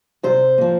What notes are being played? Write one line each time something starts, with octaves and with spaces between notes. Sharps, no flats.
C3 C5
F3 A#3